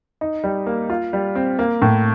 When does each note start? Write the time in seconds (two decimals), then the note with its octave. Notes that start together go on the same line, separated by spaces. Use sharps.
0.21 D#4
0.44 G3
0.67 A#3
0.90 F4
1.13 G3
1.35 C4
1.59 A#3
1.82 A2